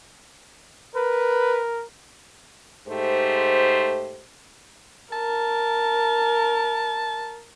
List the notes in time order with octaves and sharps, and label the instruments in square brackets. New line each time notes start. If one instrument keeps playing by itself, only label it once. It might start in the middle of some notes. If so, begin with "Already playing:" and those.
[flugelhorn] A#4 [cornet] B4
[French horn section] G#2 A3 G4 C5
[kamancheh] A#4 [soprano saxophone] A5